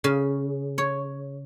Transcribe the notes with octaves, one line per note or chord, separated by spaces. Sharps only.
C#3
C#5